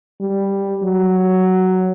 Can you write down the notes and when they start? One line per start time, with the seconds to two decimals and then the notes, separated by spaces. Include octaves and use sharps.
0.21 G3
0.83 F#3